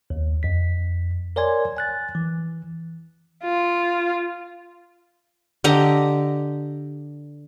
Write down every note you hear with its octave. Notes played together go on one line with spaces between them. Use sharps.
D#2
F2 B6
A#4 C#5 D5 G#5 C6 G#6
G#5 F#6 A6
E3
F4
D3 G4 D#5 A#5